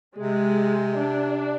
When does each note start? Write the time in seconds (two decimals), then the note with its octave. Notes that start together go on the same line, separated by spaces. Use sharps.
0.17 C3 G#3
0.98 D4